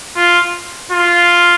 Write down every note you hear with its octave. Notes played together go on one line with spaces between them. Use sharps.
F4
F4